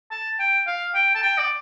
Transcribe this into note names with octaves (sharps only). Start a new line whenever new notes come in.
A5
G5
F5
G5
A5
G5
D5